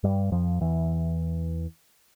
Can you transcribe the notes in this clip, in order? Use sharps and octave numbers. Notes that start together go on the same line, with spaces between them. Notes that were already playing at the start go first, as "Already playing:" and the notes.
G2 G3
F2 F3
E2 E3